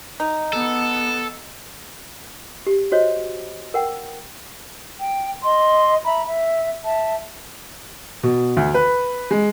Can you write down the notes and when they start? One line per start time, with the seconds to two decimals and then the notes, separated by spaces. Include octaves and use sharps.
0.20 D#4
0.53 B3 A4
2.67 G4
2.92 F#4 C5 C#5 D#5
3.74 A#4 F#5 G5
5.00 G5
5.43 D#5 C6
6.05 E5 A#5 B5
6.25 E5
6.84 E5 A5
8.23 B2
8.57 D2
8.74 B4
9.31 G#3